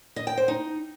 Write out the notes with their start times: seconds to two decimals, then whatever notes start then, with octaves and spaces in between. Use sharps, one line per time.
0.16 D#5
0.27 G5
0.37 C5
0.48 D#4